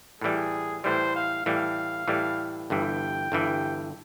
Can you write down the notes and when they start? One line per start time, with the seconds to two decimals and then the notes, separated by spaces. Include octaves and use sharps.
0.21 A2 E3 G3 G#4
0.84 A2 E3 G3 C5
1.15 F5
1.46 A2 E3 G3 F5
2.08 A2 E3 G3
2.70 G1 G2 E3 G5
3.32 G1 G2 E3